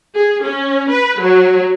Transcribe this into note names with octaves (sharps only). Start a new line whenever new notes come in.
G#4
C#4
B4
F#3